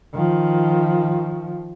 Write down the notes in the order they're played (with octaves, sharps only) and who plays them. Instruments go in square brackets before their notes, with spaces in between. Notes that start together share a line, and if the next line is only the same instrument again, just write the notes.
[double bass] D#3 F3